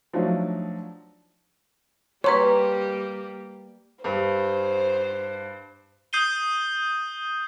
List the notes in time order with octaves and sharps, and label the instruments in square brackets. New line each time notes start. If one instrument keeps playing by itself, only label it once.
[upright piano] F3 F#3 A3 D4 D#4 F4
[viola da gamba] G3 A#3 G4 [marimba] B4 A#5 C6 [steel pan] C#5
[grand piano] G2 [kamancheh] C5
[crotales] D#6 G6 C7 D#7 G7